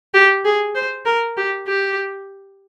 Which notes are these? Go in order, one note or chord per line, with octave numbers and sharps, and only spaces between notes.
G4
G#4
C5
A#4
G4
G4